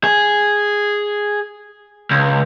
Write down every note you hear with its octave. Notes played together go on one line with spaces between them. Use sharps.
G#4
C#2